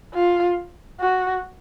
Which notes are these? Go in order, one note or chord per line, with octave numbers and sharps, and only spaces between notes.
F4
F#4